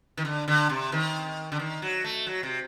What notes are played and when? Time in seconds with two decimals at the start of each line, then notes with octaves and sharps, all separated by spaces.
0.17 D#3
0.25 D3
0.48 D3
0.69 C3
0.92 D#3
1.52 D3
1.59 D#3
1.82 F#3
2.04 A3
2.26 F#3
2.43 C3